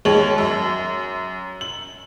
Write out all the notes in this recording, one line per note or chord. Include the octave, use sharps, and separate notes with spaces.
D#2 G#3 C#5 F#7
F#2
F#7